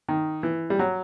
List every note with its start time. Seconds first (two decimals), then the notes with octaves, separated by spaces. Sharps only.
0.09 D#3
0.43 E3
0.70 G3
0.79 F#3